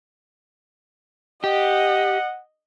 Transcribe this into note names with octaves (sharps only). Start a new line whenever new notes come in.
G4 D#5 F#5